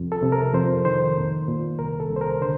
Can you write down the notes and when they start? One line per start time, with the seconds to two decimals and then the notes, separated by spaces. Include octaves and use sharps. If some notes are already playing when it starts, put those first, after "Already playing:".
Already playing: C2 F2
0.12 A4
0.23 C3
0.32 A#4
0.54 F2 C5
0.85 D#3 C5
1.16 A#2
1.48 A#2
1.79 C2 A#4
2.00 A4
2.10 C2
2.16 C5
2.21 A#4
2.41 D3 C5